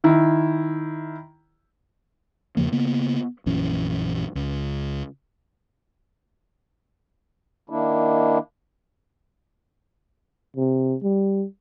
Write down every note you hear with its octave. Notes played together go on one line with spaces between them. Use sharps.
D#3 E4
E2 C#3 F3 A#3
C#3 A#3 B3
A#1 F#2 E3 C#4
C#2
D#3 A#3 D4 E4
C3
G3